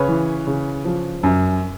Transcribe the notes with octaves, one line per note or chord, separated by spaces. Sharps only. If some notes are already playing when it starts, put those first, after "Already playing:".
Already playing: C#3 B4 C#5
E3
C#3
F3
F#2